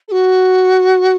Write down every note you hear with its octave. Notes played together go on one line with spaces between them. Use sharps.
A4
F#4